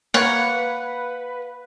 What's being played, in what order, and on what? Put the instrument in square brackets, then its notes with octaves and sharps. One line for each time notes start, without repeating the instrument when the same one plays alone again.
[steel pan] A#3 C#5 [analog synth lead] B4 [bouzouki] F5 [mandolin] F#5